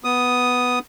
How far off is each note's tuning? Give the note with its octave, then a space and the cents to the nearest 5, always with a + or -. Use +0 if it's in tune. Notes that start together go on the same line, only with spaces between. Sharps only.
B3 +0 D#6 +0